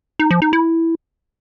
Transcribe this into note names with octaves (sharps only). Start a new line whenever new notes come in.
D#4
F3
D#4
E4